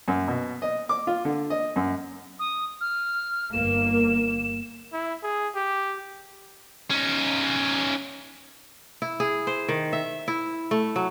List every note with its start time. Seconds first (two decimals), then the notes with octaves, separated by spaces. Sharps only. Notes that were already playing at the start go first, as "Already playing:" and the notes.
0.08 F#2
0.28 B2
0.62 D#5
0.89 D6
1.07 F4
1.25 D3
1.50 D#5
1.76 F#2
2.39 D#6
2.81 F6
3.53 G1 A#3 E7
4.93 E4
5.23 G#4
5.55 G4
6.90 C#4 D#4
9.02 E4
9.20 G#4
9.47 C5
9.68 D#3
9.93 E5
10.28 E4
10.71 A3
10.96 F#3